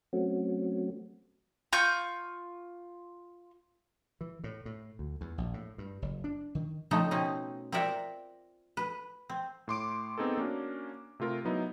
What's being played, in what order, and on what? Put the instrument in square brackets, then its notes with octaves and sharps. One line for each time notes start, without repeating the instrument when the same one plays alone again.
[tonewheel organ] F#3 A3 C4 C#4 F#4
[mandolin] F4 C#6 G6
[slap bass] E3
A2
A2
D2
E2
A#1
A2
G2
F#1
D4
D#3
[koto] C#3 F3 A3 C4 D#4 A4
B2 C4 C#4 D#4
C4 F4 A#4 D5 E5 F#5
B4
C4
[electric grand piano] A2 C6 D6 D7
B3 C4 D#4 G#4 A4
A#3 C#4 D4 F#4
C3 A3 F4 A#4
F#3 B3 D#4 E4